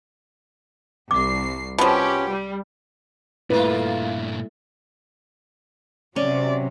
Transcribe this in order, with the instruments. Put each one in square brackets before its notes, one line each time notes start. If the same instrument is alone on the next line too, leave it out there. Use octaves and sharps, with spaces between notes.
[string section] C2 C7 [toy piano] D6
[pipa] B2 F3 [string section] C#4 G4
[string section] G3
[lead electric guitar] G2 A#2 [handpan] A3 E4 [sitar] A#3 F4 [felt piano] B4
[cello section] C3 F#3 [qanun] C#4 [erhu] D5